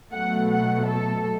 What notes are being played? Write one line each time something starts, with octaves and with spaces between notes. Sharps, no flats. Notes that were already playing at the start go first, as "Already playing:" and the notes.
B2 F#3 A3 F#5
F#5
A4